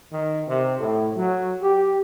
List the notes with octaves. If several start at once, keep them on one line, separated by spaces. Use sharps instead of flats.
D#3
C3
A2
F#3
G4